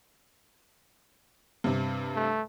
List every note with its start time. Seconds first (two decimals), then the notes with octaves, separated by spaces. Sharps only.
1.64 G2 C3
2.16 A3